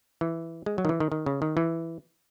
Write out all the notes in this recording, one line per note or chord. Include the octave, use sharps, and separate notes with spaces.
E3
G#3
F#3
D#3
E3
D#3
D#3
C#3
D#3
E3